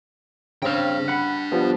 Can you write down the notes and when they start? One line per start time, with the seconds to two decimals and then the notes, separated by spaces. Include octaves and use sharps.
0.62 C#3 C4 D4 G5 F6
1.08 F#5 B5
1.52 F3 G3 B3